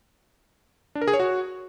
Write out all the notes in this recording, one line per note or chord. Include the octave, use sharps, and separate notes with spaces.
D4
A#4
G#4
C#5
F#4